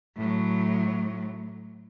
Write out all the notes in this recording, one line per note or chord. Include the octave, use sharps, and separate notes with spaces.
A2 F#3